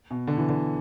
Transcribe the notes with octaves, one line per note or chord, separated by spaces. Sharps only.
B2
D3
E3
D3